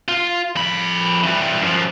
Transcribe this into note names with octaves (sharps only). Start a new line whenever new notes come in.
F4
F2 B5
E3 G3
F#2 F3